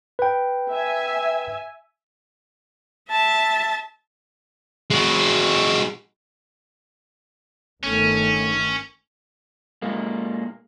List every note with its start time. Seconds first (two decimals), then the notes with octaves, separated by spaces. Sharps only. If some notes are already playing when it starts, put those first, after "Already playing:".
0.19 B4 G5
0.71 E5 G#5
3.10 E5 A5
4.90 G#3 F#4
7.83 G1 D#3 A3 C#4
9.82 A#2 G#3 A#3